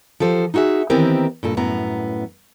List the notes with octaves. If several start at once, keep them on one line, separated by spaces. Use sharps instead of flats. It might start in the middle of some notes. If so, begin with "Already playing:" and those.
F3 G4 A4 C5
D#4 E4 F#4 G#4 E5
D#3 E3 B3 C4 G4 A#4
G2 A#2 A4
F#2 A2 B3 A#5